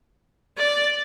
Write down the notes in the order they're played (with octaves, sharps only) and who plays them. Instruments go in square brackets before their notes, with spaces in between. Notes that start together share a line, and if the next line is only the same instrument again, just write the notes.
[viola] D5